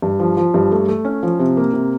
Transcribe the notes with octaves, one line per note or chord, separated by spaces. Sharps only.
G2
F3
F3
G2
A3
A3
C#4
F3
C3
A#3
C3